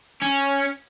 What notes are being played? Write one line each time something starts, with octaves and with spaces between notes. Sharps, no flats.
C#4